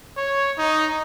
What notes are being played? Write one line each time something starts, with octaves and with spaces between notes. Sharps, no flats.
C#5
D#4